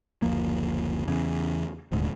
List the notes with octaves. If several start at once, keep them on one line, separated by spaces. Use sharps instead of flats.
F#1 D2 F3 A#3
E2 C#3
D#1 D2 G#2